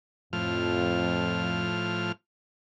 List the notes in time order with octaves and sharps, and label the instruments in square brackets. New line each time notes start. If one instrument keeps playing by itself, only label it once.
[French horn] F2 [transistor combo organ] A2 F3 F6